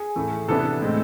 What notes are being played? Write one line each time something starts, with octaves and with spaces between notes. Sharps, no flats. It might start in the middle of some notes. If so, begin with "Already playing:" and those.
Already playing: G#4
A2 E3 A3
C3 E3 B3 D4 A4
A2 G#3 C4